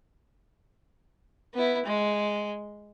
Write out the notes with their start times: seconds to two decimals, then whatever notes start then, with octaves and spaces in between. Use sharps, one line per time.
1.54 B3 E4
1.86 G#3